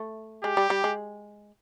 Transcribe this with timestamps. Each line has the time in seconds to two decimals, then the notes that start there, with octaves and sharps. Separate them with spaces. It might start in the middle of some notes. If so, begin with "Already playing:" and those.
Already playing: A3
0.43 G#3 G4
0.57 G3
0.70 G3
0.84 G#3